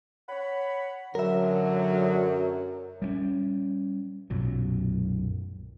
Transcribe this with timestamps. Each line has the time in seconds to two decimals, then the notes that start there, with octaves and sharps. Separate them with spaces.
0.29 C#5 F#5 B5
1.15 F#2 D3 F#3 A#4 E5
3.02 G3 A#3 C#4
4.30 B1 F#2 A#2 F#3